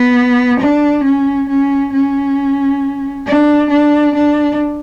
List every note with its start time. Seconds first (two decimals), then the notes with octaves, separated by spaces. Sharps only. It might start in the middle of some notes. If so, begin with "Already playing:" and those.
Already playing: B3
0.60 D4
1.04 C#4
1.49 C#4
1.93 C#4
3.27 D4
3.71 D4
4.15 D4